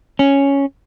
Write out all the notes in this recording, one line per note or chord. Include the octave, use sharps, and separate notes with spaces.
C#4